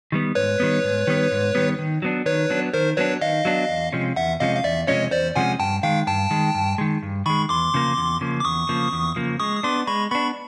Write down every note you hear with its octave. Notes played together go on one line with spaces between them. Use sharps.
D#3 G3 B3
G#2 B4 C#5
D#3 G3 B3
G#2
D#3 G3 B3
G#2
D#3 G3 B3
D#3
F#3 B3 D4
D#3 B4 C#5
F#3 B3 D4
D#3 A#4 C5
F#3 B3 D4 B4 C#5
D#3 D#5 F5
F#3 B3 D4
E2
C3 F3 G#3 C#4
E2 E5 F#5
C3 F3 G#3 C#4 D#5 F5
F5
E2 D5 E5
C3 F3 G#3 C#4 C#5 D#5
E2 C5 D5
C3 F3 G#3 C#4 F#5 G#5
G2 G5 A5
D#3 G#3 F5 G5
G2 G5 A5
D#3 G#3
G2
D#3 G#3
G2
D#3 G#3 B5 C#6
E2 C6 D6
C#3 F3 A#3
E2
C#3 F3 A#3
D6
E2 C#6 D#6
C#3 F3 A#3
E2
C#3 F3 A#3
G#3 C#6 D#6
D#6
B3 D4 C6 D6
G#3 B5 C#6
B3 D4 B5 C#6